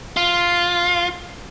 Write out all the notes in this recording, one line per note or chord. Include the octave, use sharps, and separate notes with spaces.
F4